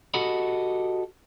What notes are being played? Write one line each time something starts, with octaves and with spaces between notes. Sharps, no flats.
F#4 G4 A4 D#5 F#5 B5